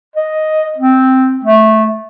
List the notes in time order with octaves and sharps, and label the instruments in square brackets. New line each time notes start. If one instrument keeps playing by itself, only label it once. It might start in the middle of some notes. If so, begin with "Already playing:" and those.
[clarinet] D#5
C4
A3